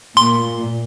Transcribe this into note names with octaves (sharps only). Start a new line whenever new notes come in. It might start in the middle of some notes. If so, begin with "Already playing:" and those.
A#2 C6